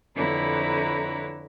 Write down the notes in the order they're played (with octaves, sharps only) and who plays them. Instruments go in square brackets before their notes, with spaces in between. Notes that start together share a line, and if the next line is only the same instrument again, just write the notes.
[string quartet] F2 D3 E4 B4 C#5 A#5